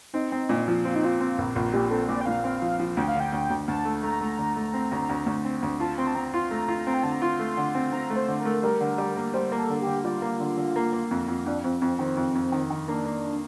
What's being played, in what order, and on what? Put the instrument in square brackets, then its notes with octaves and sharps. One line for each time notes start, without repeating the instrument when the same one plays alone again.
[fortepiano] C4 [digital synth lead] D#4
[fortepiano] C4
A#2
F3
[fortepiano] C4 [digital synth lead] F4
[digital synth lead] D#4
[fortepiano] C4 [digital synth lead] F4
[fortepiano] C4
A#1
[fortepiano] A#1 [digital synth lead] F4
[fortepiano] A#2 [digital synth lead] G4
[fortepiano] C4 [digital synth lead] A4
[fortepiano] A#2 [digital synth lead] D5
[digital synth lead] G5
[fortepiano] A#2 [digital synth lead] F5
[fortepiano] C4
F3
F3
[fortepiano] D2 [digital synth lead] G5
[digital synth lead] F5
[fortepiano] D3
[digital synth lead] G5
[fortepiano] D2
D2
[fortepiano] D2 [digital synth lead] A5
[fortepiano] A3
[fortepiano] A3 [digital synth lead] A#5
[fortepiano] A3
D3
A3
C4
D2
D2
D2
C4
D2
[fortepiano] F4 [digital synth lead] A5
[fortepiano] C4 [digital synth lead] C6
[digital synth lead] A5
[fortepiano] C4 [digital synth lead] A#5
[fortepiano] F4 [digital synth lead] C6
[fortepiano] A3 [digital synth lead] A#5
[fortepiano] F4
C4
[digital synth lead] G5
[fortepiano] D3 [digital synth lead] A5
[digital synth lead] A#5
[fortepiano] F4 [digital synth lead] C6
[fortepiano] A3
D3
C4
[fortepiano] C4 [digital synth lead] A#5
[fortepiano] A3
[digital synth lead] C5
[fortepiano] D3
[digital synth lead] A#4
[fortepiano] A3
[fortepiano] G3 [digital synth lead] A#4
[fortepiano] D3
G3
A#3
[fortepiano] G3 [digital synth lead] C5
[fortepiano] A#3
[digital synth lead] A4
[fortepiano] D3
[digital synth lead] G4
[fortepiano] D3
[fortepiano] G3 [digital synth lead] F4
[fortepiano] A#3
D3
D3
A#3
A#3
F2
F2
[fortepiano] F2 [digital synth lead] D4
[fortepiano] F2 [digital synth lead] C4
[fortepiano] F2 [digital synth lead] C4
[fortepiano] D#3 [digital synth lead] C4
[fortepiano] F2
F2
D#3
D#3
[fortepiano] A#3 [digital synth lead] D4
[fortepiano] A#3